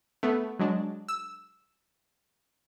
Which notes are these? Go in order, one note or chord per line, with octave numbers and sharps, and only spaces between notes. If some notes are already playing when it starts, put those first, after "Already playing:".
A3 B3
F#3 G#3 D4
E6